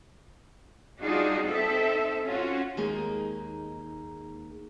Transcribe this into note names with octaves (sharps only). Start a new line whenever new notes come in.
G3 D4 D#4 F4 F#4 G#4
C4 D#4 A4 E5
C#4 F4 F#4
D#2 G#3 A#3 D#4 G#4 A#4